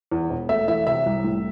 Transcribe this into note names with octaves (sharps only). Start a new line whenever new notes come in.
E2
E1
A3 E5
E3 E5
C3 E5
C2
A2